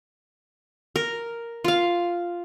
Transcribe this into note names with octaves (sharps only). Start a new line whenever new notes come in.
A#4
F4 F5